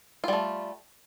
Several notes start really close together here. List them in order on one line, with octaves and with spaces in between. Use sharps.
F4 G3 A3